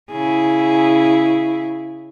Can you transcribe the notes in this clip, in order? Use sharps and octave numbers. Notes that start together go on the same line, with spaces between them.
C#3 E4 G#4